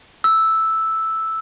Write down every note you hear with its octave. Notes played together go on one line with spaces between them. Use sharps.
E6